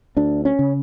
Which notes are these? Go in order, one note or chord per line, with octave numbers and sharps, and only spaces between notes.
D2 D4
C#4
C#3